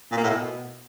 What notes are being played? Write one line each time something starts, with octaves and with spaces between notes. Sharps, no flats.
A#2
A#3
A2
B2